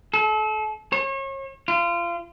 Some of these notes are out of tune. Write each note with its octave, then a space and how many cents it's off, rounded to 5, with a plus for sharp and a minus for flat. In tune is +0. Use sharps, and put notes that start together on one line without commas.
A4 -35
C#5 -35
F4 -30